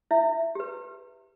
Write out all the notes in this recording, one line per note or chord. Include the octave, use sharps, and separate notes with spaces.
E4 E5
G4 B4